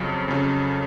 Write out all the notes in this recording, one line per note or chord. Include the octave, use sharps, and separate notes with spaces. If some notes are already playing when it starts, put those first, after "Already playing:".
Already playing: F2 C#3 F#3
F2 C#3 F#3